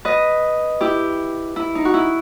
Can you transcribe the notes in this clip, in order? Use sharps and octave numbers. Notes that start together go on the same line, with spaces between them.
B4 D#5
E4 G4
E4
D#4
F#4
E4